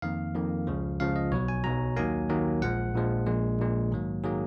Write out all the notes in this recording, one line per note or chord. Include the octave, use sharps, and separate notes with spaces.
F2 D#3 A#3 F5
F2 D#3 A#3
C#2 C#3 F3
C#2 C#3 F3 F5
D#5
B1 B2 F#3 C#5
G#5
B1 B2 F#3 A#5
D#2 D#3 F#3 A#3 G#5
D#2 D#3 F#3 A#3
A#1 A#2 F3 G#3 F#5
A#1 A#2 F3 G#3
A#1 A#2 G#3
A#1 A#2 G#3
G#2 D#3 F#3 A#3
D#3 F#3 A#3 G#4